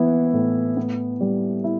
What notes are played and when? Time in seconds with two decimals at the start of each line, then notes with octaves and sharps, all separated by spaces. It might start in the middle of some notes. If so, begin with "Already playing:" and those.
Already playing: E3 B3 E4
0.33 A2
0.77 B3
1.21 G3
1.64 E4